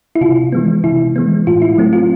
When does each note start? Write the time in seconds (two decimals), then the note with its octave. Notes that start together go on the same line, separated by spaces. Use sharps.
0.15 E4
0.21 C3 F4
0.52 E3 G#3 B3
0.84 C3 E4
1.16 E3 G#3 B3
1.47 A2 F4
1.62 E4
1.78 F#3 A3 C4
1.93 F4